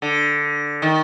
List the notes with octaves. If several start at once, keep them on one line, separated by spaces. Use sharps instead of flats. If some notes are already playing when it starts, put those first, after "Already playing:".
D3
D#3